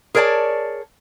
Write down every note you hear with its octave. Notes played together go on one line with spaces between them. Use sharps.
G#4 A#4 C#5 D5 A5